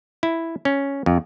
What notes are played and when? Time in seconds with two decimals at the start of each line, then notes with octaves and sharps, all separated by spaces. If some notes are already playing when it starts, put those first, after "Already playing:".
0.23 E4
0.65 C#4
1.06 F2